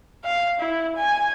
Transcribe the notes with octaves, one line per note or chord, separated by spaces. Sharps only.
F5
E4
G#5